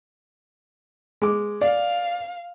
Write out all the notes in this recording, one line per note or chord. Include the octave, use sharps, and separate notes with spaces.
G#3 D6
D5 F5